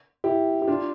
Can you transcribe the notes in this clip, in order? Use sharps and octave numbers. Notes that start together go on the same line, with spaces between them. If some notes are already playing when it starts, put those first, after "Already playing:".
E4 G4
G4
D4 F4